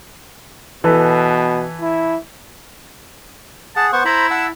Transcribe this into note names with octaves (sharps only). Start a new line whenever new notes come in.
B2 E3 A4 B4
E4
G#4 F#5 A5
B3 C5 F#5 C#6
E4 C5 A#5 B5
F#5 A5 E6